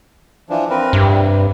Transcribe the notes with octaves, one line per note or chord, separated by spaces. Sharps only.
E3 F3 D4
C4 A#4 B4
G2 C3